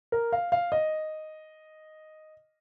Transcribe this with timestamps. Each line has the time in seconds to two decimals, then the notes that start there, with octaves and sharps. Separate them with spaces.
0.12 A#4
0.32 F5
0.52 F5
0.72 D#5